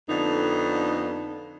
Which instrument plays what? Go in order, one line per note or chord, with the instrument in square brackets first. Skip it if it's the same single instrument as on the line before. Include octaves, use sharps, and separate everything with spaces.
[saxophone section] F2 D3 B3 D#4